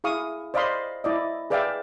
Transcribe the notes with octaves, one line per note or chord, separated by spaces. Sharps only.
E4 G#4 F5 C#6 D#6
C5 D5 D#5 F5 B5 C6
E4 D5 D#5
G#4 B4 D5 E5 F5 G5